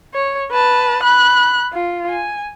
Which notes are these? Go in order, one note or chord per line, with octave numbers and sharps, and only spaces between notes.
C#5
B4 A5
B5 F#6
F4
G#5